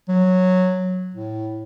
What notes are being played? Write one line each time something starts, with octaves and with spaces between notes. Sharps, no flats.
F#3
A2